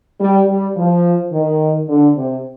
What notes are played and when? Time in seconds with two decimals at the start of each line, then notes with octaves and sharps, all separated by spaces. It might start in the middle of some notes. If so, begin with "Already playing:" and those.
0.20 G3
0.48 G3
0.76 F3
1.32 D#3
1.88 D3
2.16 C3